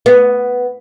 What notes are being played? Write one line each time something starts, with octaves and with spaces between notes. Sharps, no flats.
B3